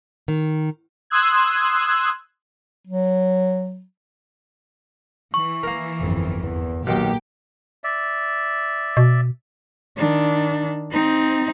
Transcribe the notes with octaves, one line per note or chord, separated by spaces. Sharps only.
D#3
C6 D#6 E6 F#6 G#6
F#3
E3 C#6
A#3 A#4
G1 F2
E2
B1 A#2 D#3 A#3 G4 D6
D5 E5
B2
D#3 D4
C4 D#4